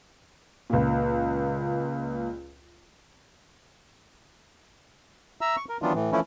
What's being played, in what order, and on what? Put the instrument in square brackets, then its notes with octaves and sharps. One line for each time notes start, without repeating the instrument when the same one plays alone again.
[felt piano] C#2 A#2
[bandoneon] E5 A#5 E6
C#6
A#4
D#3 E3 F#3 B3 D4 F4
A2 E3
E3 F3 A3 C#4 E4